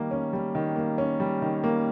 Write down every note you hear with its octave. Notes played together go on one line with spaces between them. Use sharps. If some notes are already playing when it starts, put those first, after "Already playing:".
Already playing: D#3 G3 A#3
C#4
G3
D#3
A#3
C#4
G3
D#3
A#3